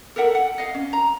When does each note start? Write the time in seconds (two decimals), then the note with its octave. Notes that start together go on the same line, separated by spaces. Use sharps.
0.16 A4 A#4 E5 F#5
0.35 F#5
0.58 D#5 F5
0.75 C#4
0.93 A#5